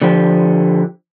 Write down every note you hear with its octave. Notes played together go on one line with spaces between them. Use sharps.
D3 F3 G4